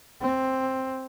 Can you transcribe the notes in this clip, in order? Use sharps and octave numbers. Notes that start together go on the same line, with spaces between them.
C4